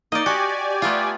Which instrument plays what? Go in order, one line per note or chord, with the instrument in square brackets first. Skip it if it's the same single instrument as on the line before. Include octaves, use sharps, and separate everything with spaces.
[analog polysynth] A#3 D#4 [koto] D5 D#5
[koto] F#4 [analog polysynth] G4 D5 G#5
[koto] A3 B3 F4